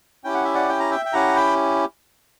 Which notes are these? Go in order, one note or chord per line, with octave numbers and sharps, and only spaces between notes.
C#4 E4 G4 G5
F#5
E5
D5 F#5
G5
A#5
E5 G5
G5
C#4 E4 G4 F#5 A#5
G5 B5